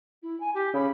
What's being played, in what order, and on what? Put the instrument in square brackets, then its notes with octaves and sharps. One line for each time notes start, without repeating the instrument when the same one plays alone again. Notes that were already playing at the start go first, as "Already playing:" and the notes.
[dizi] E4
G#5
G4
[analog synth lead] C#3 [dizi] B5